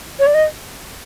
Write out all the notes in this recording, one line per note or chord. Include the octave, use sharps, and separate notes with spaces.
C#5
D5
D#5